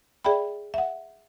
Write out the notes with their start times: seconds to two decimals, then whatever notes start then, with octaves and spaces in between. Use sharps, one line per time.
0.24 G#4 D5 E5 G5 B5
0.74 E5 F#5